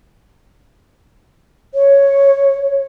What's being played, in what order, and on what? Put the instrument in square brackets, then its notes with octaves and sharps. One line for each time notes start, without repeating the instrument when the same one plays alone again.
[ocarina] C#5